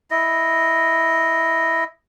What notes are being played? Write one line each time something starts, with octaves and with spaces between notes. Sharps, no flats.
E4 D#5